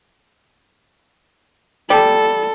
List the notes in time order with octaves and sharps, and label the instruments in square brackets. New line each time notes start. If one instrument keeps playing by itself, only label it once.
[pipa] G3 [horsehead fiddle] A4